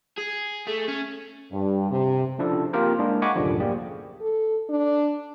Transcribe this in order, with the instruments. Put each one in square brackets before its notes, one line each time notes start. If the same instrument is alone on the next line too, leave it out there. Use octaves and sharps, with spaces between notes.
[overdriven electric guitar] G#4
A3
C#4
[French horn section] G2
C3
[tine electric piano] C#3 F3 D4 E4 A4
A#3 C4 F4 G4 A#4 C5
G#3 A#3 D4 E4 G#4
D#5 F#5 G#5 B5 C#6 D6
C2 F#2 A2 D3 F3 G3
A#3 G4 G#4 D5
[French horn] A4
D4